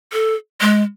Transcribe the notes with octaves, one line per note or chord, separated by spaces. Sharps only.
A4
G#3